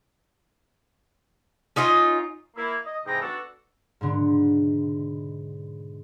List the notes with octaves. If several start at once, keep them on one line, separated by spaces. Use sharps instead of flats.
C#4 D#4 F4 D#5
A#3 E4
D#5
G#2 C3 E3 G#4 G5 A#5
B3 D4 F#4 A4
G#2 B2 D3